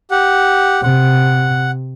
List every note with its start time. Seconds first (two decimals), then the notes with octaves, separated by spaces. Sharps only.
0.11 G4 F#5
0.83 C3 F#5